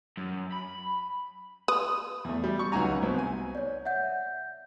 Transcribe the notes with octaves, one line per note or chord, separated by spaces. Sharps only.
F#2
B5
B4 D#6
E2 A3
G3
C#6
C#2 F#3 D#4 F#4 G#5 A#5
C2 B3 C4
G#5
C#5 D5
E5 F#5 G6